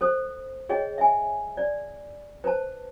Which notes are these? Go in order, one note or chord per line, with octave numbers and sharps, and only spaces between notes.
A4 C5 D#6
G#4 C#5 D#5 G5
E5 G#5
D5
B4 C5 A5